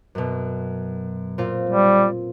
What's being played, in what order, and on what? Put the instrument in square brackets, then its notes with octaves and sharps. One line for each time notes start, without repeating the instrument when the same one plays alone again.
[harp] F#2 B2
A#2 C4 F4
[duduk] G3